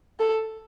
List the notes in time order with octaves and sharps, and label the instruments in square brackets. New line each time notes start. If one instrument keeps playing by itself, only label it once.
[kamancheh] A4